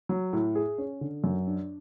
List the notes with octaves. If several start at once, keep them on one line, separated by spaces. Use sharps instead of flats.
F#3
A2
G#4
C#4
D3
F#2
D4